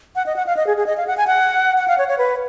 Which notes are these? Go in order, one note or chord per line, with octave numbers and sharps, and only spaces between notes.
F#5
D#5
F#5
F5
D#5
G#4
G#4
D#5
F5
F#5
G#5
F#5
F#5
F5
C#5
C#5
B4